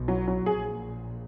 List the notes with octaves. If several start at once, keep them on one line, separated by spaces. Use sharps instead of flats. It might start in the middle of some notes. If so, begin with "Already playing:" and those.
Already playing: B1 B2
F#3
F#3
A#1 A#2 G#4